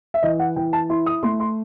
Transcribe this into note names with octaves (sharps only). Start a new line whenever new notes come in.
E5
E3 D#5
F#5
E3 G5
A5
E4 C6
D#6
A3 C6
C6